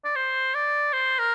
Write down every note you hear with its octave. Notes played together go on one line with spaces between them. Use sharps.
D5
C5
D5
C5
A#4